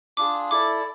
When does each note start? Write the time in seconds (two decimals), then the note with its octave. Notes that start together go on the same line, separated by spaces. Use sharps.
0.17 D4 F4 G#4 D6
0.51 E4 A4 D5 D6